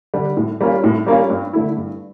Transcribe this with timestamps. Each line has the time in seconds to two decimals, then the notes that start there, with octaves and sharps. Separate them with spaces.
0.14 D3 G3 D4
0.37 A2
0.61 G3 A#3 C#4 F4
0.84 A2
1.07 G3 A#3 C#4 F4
1.30 G2
1.53 D3 A3 E4
1.77 G2